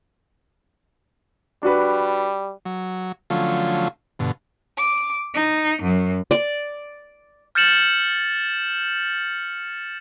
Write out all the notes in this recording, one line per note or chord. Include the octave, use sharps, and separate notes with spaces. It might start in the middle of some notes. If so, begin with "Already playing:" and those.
G3 D4 F#4 B4
F#3
D3 F3 F#3 A3 C#4 F4
G2 B2 D3
D6
D#4
F#2
D5
F6 G6 A6 C#7 E7 F#7